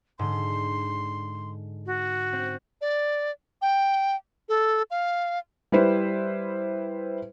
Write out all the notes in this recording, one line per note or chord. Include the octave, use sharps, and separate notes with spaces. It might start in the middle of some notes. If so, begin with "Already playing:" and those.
G#2 D3 C6
F#4
C4
D5
G5
A4
F5
G3 E4 B4 C5